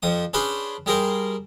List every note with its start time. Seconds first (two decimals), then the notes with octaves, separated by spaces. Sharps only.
0.03 F2 F3 D#6
0.34 C#4 D4 G#4 B4 C5
0.86 G3 G#4 A#4 C5